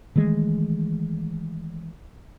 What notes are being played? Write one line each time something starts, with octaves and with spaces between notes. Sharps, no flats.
D#3 E3 G#3 A3